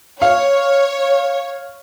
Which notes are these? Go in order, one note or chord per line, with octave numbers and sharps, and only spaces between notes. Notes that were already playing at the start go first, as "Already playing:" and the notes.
C#5 F5